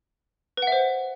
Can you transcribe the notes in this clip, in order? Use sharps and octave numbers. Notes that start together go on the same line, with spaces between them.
B4 C5 E5 F#5